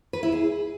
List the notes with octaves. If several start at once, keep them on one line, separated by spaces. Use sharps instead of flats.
B4
E4
G#4